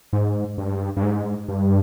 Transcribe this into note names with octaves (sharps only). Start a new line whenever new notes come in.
G#2
G2
G2
G#2
G2